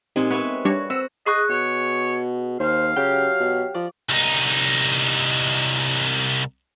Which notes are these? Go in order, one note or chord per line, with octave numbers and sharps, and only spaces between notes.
A#2 G#3 C4 D#4 G4 G#4
B3 B4 C#5 E5
G3 D4 F#4 C#5
C4 F#4 C5 E6
G#4 D#5 C#6 F#6
B2 C#5
D#2 C5 F5
C#3 F#3 G4
B2
F3 D5
C2 D#4